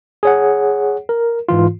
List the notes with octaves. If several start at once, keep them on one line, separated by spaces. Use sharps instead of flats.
G#4 C#5 F#5
A#4
G#2 E3 F4